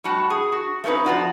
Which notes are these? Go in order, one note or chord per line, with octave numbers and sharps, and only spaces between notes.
A2 G3 F#4 A5
G#4
F#4
A3 C4 C#4 D#4 B4
F2 F4 F#4 D5